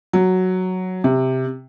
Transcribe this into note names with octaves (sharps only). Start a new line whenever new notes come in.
F#3
C3